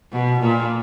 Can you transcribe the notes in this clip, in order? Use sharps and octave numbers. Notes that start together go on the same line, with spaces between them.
B2
A#2